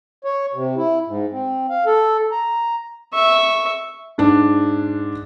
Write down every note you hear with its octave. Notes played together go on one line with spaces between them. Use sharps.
C#5
C3
E4
G#2
C4
F5
A4
A#5
E5 C#6
G#2 D4